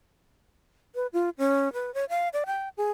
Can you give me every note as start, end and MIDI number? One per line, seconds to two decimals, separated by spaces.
0.95 1.07 71
1.13 1.30 65
1.38 1.72 61
1.73 1.93 71
1.94 2.05 73
2.09 2.29 77
2.33 2.44 74
2.46 2.69 79
2.77 2.91 68